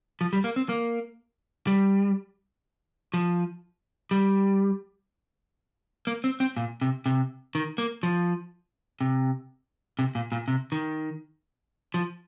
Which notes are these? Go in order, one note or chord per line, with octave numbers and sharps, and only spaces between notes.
F3
G3
A#3
C4
A#3
G3
F3
G3
A#3
C4
C4
A#2
C3
C3
D#3
A#3
F3
C3
C3
A#2
A#2
C3
D#3
F3